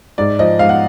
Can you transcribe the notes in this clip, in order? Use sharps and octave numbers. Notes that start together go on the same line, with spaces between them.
G#2 D5
F3 D#5
G#2 F5
F#5